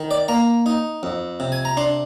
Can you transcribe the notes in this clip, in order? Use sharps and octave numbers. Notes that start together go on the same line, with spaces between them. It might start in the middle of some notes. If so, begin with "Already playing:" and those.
Already playing: D#3
D5
A#3 A#5
D#4
F2
C3
G#5
A#5
D4 C6